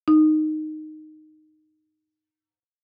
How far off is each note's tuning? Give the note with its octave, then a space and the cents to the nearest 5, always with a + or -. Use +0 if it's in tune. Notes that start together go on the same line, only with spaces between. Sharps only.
D#4 -10